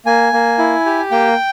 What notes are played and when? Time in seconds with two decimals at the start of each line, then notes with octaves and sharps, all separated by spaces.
0.06 A#3 G#5
0.33 A#3
0.58 E4
0.86 G4
1.11 A#3 G5